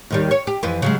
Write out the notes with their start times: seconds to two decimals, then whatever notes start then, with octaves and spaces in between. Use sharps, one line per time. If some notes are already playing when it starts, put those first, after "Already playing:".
0.10 D#2 D#3 G3
0.31 C#5
0.47 G4
0.63 F2 E3 B4
0.82 C#3 F#3 G#3